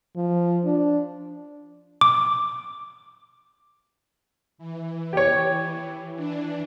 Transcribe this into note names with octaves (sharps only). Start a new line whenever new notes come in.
F3
D4
D6
E3
G4 C#5
E3 D4